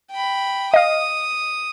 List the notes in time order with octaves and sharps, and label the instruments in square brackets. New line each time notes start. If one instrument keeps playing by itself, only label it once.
[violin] G5 B5
[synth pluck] D#5 F5 [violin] D#6